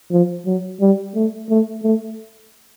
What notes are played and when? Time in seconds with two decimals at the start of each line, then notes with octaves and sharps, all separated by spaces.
0.11 F3
0.46 F#3
0.81 G3
1.15 A3
1.50 A3
1.83 A3